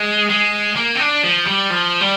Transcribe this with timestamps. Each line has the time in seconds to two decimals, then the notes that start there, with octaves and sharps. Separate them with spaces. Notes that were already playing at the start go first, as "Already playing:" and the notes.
Already playing: G#3
0.29 G#3
0.76 A#3
0.95 C4
1.00 D4
1.24 F3
1.47 G3
1.70 F3
2.01 G3